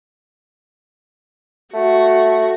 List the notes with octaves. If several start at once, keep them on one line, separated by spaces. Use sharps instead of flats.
A3 F#4